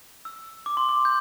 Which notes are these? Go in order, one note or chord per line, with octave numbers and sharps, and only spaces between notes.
E6
D6
C6
D6
G6